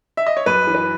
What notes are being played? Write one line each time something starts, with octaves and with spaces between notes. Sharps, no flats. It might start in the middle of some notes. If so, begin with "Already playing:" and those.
E5
D#5
C#5
F#2 B4
E3
B4